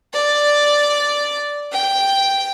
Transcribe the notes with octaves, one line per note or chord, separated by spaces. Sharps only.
D5
G5